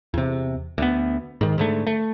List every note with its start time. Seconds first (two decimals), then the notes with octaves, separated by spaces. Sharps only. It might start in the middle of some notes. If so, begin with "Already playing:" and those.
0.14 E2 C3
0.78 D2 B3
1.41 G#2 D#3
1.58 G#2 D3 A3
1.87 A3